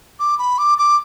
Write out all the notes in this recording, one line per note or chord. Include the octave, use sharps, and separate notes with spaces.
D6
B5
D6
D6